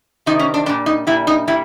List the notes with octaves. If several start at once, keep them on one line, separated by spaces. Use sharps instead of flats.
C3 D#3 G3 D#4
C#4
D4
A#2 G3 D4
D#4
A#2 G3 E4
D#4
A#2 G3 E4